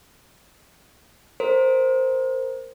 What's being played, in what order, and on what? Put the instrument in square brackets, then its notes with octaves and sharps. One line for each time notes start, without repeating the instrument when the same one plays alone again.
[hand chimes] A#4 C5